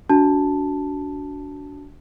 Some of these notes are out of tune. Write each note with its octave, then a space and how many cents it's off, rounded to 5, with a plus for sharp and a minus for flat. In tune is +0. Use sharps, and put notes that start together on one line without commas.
D4 -30 F#4 +0 A5 +0